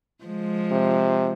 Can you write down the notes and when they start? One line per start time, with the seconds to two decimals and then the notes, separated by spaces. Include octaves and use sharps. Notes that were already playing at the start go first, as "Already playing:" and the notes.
0.24 F3 G#3
0.71 C3